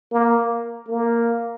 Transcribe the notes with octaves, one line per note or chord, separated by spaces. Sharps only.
A#3
A#3